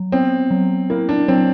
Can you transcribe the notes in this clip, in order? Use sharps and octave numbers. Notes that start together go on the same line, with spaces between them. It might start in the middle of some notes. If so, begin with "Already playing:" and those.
Already playing: F#3
B3 C4
F#3
A#3 E4
D4
F#3 C4